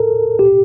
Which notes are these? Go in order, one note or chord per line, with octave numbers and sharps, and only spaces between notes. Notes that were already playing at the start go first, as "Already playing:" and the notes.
Already playing: A4 A#4
G4